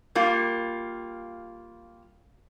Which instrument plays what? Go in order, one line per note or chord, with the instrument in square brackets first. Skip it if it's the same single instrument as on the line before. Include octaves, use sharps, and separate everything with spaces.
[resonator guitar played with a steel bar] G3 A#3 F4